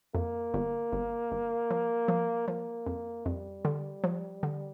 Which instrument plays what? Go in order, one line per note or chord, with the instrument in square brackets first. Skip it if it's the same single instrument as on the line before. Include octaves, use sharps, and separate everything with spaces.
[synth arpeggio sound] F2 [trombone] A#3
[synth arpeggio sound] G1
G1
G1
F3
F3
[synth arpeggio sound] F3 [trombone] A#3
[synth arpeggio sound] F2
[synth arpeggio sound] F2 [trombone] G3
[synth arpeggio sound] D3
F3
D3